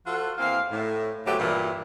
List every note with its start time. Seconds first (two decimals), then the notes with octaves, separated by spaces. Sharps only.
0.06 F3 F4 F#4 A4
0.38 E2 E3 A#3 C4 F5
0.70 A2
1.26 D2 G#2 F#3 A3 B3 G4
1.39 G2 A#2 E3